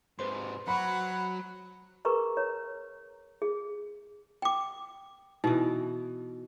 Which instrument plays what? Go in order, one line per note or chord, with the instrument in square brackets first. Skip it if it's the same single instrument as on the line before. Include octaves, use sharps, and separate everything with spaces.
[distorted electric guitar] G#2 C3 [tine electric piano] B4 C5 C6
[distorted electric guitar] F#3 [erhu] F#5 [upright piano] B5
[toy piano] G#4 A#4 B4 A#5 C#6
C#5 A#5
G#4
G5 D6
[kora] B2 E3 [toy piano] D#4